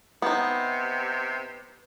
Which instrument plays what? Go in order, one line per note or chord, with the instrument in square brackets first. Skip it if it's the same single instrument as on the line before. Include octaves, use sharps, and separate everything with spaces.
[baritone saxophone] C3 [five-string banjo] B3 D#4